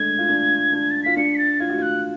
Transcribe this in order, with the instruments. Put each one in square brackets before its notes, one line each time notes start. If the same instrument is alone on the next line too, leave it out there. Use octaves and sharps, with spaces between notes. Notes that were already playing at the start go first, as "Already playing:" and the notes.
Already playing: [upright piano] G#3 A3 D4 [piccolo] G#6
[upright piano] F4
D4
D4
[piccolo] A6
[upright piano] F4 [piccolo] B6
[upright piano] D4 [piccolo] C#7
[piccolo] B6
A6
[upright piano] F4 [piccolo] G#6
[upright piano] F#4
[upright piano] F4 [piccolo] F#6